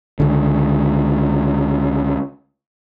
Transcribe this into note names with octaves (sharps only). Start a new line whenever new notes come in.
C#2 D3